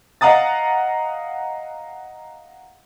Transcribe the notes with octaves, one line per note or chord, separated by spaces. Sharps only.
D#5 F5 F#5 A#5 D#6 A6